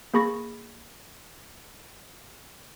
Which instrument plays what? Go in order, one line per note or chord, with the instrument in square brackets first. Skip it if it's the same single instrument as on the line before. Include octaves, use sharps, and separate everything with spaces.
[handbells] A#3 G#4 B5 C#6 A#6